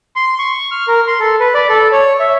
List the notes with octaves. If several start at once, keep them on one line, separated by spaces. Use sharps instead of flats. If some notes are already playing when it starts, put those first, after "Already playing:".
C6
C#6
F6
A#4
C6
A4
B4
D5
A4
C#5
E5